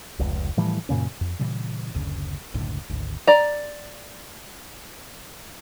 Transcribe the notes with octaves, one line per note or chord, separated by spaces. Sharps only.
F1 C#2
A2 E3 F3 G3
F#2 A#2 C#3 C#4
F2
A#2 C#3 E3 G3
F#1 D2 C#3
F#1 C#2 A2 D3
G#1 D2
D5 A#5